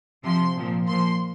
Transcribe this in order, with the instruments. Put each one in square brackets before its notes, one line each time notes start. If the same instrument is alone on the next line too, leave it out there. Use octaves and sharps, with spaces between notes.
[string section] C3 F3 C6
A#2 F3
A#2 F3 C6